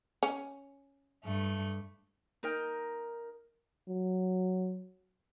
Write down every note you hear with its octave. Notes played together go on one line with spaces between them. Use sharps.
C#4
G2 A3
D#4 A#4 G5
F#3